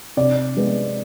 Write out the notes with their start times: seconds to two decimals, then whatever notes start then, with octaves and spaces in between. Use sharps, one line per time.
0.17 C3 D5
0.57 G#3 B3